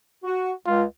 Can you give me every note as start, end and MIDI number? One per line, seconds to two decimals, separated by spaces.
0.24 0.51 66
0.65 0.84 37
0.65 0.84 65